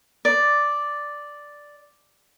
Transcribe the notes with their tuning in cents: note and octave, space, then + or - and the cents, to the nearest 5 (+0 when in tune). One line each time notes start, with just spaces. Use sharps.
D5 +0